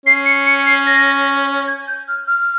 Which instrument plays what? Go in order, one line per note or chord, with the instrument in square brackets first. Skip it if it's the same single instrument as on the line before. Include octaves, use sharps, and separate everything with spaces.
[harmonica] C#4 [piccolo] C7
[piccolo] C#7
C#7
C7
A#6
G#6
G6
F6
F6